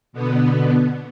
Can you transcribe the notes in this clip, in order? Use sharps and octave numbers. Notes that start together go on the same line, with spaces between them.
B2 D3 B3